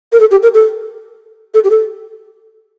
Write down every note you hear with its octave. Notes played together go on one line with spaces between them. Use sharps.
A#4
A4
G4
A#4
A4
A4
G4
A4